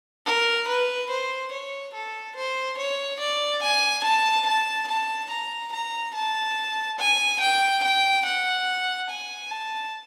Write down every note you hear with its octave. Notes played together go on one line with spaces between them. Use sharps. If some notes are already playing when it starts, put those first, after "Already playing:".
A#4
B4
C5
C#5
A4
C5
C#5
D5
G#5
A5
A5
A5
A#5
A#5
A5
G#5
G5
G5
F#5
G#5
A5